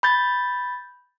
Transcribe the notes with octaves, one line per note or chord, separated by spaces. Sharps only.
B5 G6 A6